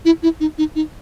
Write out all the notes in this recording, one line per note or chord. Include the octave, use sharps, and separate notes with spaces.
E4
E4
D#4
D#4
D#4